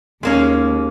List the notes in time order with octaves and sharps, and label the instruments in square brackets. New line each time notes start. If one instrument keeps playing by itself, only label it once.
[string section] D#2 [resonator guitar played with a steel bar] G#3 A#3 C#4